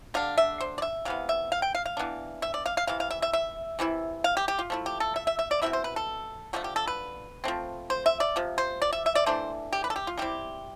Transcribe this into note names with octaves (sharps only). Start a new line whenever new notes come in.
D3 G3 D4 F5
E5
C5
D5
E5
C3 E3 B3 F5
E5
F5
G5
F5
F5
E3 B3 D4
E5
D5
F5
F5
C3 E3 F5
F5
E5
E5
E5
C3 E3 B3 E4
F5
G4
G4
F4
F3 A3 E4
G4
A4
E5
E5
E5
D5
B2 A3 C4 E4 E5
C5
B4
A4
D3 F3 A3 G4
G4
A4
B4
F3 A3 C4
C5
E5
D5
C3 F3
C5
D5
E5
E5
D5
E3 A3 D4 C5
G4
B4
A4
G4
F4
D3 G3 C4 E4 G4